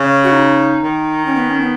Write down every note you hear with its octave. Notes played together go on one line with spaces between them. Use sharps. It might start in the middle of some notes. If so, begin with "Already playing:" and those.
Already playing: C#3
F#4
D#4
D#3
C#4
B3
C#4
B3